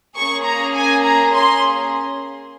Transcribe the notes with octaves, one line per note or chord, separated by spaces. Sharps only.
A#3 C#4 G#4 C#6
A#5
G#5
A#5
C6